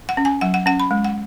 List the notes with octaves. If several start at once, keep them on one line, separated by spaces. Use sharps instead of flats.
F#5
C#4
G#5
F#3 F#5
F#5
C#4 F#5
B5
G#3
F#5